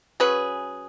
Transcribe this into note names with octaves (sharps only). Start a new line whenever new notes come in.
F#3 C#4 G#4 B4